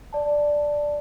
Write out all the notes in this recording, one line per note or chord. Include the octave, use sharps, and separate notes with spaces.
D5 A5